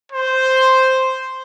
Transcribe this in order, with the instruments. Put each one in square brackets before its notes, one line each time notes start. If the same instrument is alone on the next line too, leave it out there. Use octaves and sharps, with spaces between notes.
[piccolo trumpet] C5